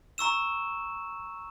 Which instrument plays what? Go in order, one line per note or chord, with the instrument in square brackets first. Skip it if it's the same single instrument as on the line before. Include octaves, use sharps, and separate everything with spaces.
[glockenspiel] A#5 C#6 E6 E7